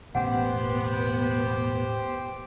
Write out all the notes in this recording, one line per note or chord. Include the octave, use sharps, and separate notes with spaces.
E1 A2 B3 C#4 G4 C5 F#5 G5